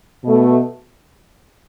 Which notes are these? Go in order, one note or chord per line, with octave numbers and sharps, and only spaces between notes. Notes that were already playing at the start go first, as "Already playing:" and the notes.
B2 A3